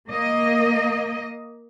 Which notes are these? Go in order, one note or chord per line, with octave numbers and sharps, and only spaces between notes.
A#3 D#5